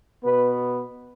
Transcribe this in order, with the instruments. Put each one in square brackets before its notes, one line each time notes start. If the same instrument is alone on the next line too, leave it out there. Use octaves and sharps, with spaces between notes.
[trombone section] B2 B3 B4